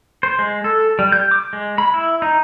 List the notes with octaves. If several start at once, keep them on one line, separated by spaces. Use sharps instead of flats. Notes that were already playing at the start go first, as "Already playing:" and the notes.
C5
G#3
A4
G3
G6
D6
G#3
B5
E4
D#4